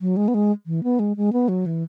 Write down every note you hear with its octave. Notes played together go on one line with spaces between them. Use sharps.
F#3
G#3
B3
G#3
E3
B3
G#3
G#3
B3
F#3
E3